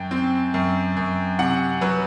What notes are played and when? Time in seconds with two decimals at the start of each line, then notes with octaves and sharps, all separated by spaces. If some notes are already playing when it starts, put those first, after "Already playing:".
Already playing: F#2 G5
0.11 C4
0.54 F#2
0.97 F#2
1.39 C3 F#5
1.81 F#3 B4